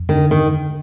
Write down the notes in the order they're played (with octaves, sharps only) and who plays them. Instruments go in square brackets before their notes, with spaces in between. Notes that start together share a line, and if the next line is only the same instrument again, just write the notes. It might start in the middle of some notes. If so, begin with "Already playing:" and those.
Already playing: [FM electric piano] F2
[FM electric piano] D3 [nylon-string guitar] D#3
[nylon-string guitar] D#3